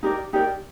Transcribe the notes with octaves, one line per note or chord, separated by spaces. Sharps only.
D#4 G4 A#4 D5
D#4 G4 A#4 D5